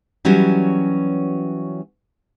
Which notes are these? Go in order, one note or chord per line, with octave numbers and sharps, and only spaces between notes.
E3 F#3 G3 B3 C#4 F#4